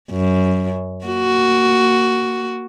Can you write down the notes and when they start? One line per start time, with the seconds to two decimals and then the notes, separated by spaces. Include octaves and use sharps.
0.10 F#2
1.05 A#3 F#4